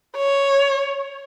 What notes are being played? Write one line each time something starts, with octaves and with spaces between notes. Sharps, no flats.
C#5